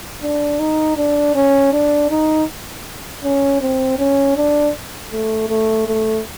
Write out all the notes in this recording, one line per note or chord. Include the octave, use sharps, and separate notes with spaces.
D4
D#4
D4
C#4
D4
D#4
C#4
C4
C#4
D4
A3
A3
A3